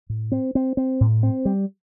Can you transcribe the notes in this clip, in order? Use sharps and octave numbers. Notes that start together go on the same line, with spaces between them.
A2
C4
C4
C4
A2
C4
G3